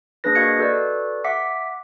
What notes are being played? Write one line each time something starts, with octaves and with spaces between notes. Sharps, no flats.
A#3 D4 G#4 B4 A#6
F#4 D#5 F5 G#6 C#7
F#4 A4 B4 D5
E5 F#5 D6 B6